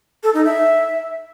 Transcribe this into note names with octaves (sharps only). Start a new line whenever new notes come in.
A4
D#4
E5